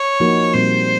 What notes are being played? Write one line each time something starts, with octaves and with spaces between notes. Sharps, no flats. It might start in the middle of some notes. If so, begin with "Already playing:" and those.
Already playing: C#5
F3 A#3 D#4 F#4 A#4
A#2 G3 C4 C5